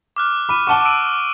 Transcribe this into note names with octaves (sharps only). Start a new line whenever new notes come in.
D6 F6 F#6
B5 D6 D#7
F#5 A5 C#6 D6 G7
E6 D7 D#7